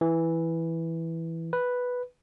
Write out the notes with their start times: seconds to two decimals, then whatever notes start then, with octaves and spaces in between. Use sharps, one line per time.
0.01 E3
1.53 B4